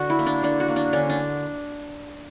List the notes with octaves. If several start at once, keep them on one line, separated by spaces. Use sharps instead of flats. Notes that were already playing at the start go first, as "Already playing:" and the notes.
Already playing: D3 F#4
E4
A#3
D4
D3 D4
F#4
A#3
D4
D3 C#4
D4